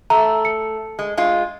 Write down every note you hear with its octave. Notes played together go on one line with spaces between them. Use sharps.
A3 A#5
C#7
G#3
G#3 F4